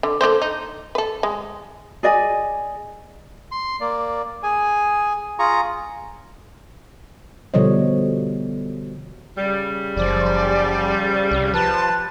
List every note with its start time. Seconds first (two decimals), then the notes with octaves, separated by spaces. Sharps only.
0.03 D3
0.21 D3 A#3 C5
0.42 D#4
0.95 A4 B4
1.23 G#3
2.03 G#4 D5 D#5 G#5
3.51 C6
3.80 A#3 D5
4.43 G#4 G#5
5.39 F4 G#4 A#5 C#6
7.54 B2 D3 F3 G3 C#5 D#5
9.38 C#3 G3
9.97 F#1 F3 D5
11.31 C2
11.54 F3 G4 B4 A5